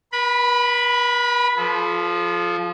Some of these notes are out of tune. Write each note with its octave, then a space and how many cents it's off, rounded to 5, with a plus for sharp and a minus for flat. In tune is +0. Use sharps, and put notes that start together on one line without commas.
B4 -45 B5 +0
F3 +0 A4 -40